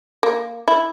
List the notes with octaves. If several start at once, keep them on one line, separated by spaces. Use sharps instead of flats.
A#3
E4